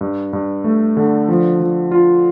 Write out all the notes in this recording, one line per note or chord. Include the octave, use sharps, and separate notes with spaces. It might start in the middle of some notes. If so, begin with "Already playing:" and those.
G2
G2
A3
D3
F3
F3
F4